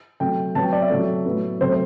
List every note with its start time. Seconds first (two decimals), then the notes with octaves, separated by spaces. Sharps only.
0.20 C3 F#3 A3 G5
0.55 C3 F#3 B3 A5
0.63 G5
0.72 D5
0.82 E5
0.90 C3 F#3 A3
1.25 A2 F#3 B3
1.61 C3 F#3 A3 C5